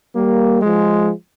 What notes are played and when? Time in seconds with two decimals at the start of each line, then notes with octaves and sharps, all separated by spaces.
0.15 G3 A#3
0.62 F3 G#3